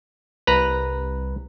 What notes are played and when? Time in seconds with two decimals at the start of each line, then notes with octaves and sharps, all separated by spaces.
0.47 C2 B4 A#5